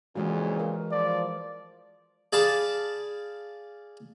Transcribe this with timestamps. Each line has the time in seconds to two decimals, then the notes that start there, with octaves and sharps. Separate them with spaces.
0.16 F2 A#2 C#3 E3 G#3 F#4
0.59 A#4
0.91 F3 D5
2.33 G#4 D5 F5 A5 B5